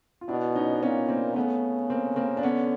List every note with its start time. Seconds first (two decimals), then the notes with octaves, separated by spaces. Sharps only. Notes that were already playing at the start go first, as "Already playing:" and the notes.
0.21 F4
0.28 B2 D4 E4
0.55 C#4 D#4
0.73 D4
0.82 A#2 B3 C#4
1.09 A#3 C4
1.36 C#3 A3 B3
1.90 A#3 C4
2.16 A#3 C4
2.37 D4
2.43 D3 B3 C#4